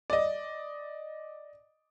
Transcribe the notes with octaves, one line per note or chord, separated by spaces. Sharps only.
D5 D#5